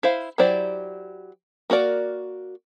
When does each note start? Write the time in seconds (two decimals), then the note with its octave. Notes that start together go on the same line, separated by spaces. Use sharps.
0.03 E4 C5 F5
0.38 F#3 E4 G4 C5 D5
1.70 A#3 F#4 A#4 D5